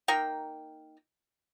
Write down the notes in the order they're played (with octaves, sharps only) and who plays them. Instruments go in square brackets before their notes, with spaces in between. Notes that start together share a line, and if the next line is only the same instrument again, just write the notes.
[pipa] A#3 D#4 A#4 G5